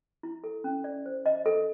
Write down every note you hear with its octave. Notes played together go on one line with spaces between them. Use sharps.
E4
A4
C#4
D5
C5
D#5
A4